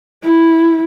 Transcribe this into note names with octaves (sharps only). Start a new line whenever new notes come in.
E4